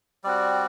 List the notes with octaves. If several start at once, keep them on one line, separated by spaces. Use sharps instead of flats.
G3 C4 F#4 D5